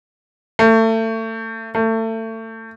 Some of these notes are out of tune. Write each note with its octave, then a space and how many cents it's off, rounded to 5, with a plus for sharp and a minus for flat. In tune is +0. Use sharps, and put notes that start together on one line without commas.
A3 +30
A3 +30